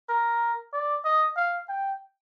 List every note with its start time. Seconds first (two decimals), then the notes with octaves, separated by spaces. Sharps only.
0.09 A#4
0.73 D5
1.05 D#5
1.36 F5
1.68 G5